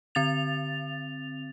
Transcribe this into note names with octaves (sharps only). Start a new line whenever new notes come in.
D3 C4 A6 F7